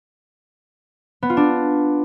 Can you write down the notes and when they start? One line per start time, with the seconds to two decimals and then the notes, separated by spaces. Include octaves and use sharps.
1.23 B3
1.30 F4
1.37 D4